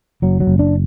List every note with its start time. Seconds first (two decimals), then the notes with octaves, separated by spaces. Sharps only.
0.22 F#1 F#3
0.40 F#3
0.47 F#1
0.59 D4